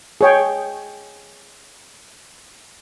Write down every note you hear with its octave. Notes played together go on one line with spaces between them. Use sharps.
G#4 C#5 G5